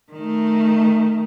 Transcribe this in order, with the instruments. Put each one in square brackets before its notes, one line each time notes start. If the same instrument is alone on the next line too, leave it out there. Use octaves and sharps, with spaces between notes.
[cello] D#3 A3